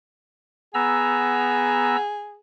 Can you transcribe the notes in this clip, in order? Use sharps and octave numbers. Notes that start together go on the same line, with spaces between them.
B3 G#4 A#5 E6